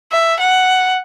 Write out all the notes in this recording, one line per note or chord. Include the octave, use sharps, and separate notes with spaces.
E5
F#5